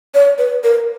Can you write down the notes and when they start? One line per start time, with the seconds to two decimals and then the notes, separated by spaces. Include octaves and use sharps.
0.14 C#5
0.38 B4
0.64 A#4